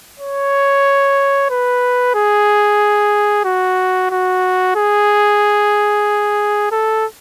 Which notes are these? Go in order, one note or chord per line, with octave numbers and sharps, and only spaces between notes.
C#5
B4
G#4
F#4
F#4
G#4
A4